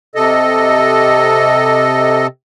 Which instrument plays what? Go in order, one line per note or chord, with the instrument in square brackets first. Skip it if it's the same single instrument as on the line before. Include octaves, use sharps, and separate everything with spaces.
[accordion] C3 A4 D#5